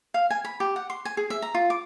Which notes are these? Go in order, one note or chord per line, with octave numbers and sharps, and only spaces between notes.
F5
G#5
B5
G4
F#5
C6
G#5
G#4
E5
A#5
F4
D6